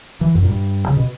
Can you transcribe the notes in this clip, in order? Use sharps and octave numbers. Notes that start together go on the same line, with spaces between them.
E3
F#2
A#2
G2
C#3
B2